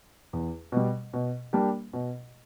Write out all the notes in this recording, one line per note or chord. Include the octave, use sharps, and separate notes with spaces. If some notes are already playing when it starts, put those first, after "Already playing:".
E2
B2 G3
B2
G3 A#3 D4 G4
B2